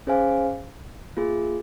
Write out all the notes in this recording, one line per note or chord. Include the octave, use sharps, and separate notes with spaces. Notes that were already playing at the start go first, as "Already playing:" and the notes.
C#4 G#4 C5 F5 G#5
A#3 F4 G#4